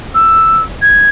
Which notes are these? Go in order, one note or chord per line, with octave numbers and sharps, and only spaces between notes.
E6
G#6